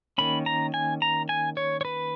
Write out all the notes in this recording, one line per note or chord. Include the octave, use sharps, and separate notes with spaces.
D#3 A#3 C#4 B5
A#5
G#5
A#5
G#5
C#5
C#5
B4